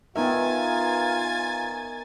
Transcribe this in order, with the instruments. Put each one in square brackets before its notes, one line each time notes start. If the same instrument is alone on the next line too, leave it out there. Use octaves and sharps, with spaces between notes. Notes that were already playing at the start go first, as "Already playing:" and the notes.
[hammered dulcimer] D#3 A#4 [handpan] B3 D#4 E5 [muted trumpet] F4 [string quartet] G#5 A6